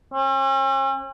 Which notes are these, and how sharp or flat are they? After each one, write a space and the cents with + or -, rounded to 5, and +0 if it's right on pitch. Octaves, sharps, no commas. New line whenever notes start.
C#4 -45